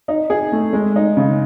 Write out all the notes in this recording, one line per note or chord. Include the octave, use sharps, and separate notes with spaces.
D#4
G#4
A3
G#3
D#4
C#3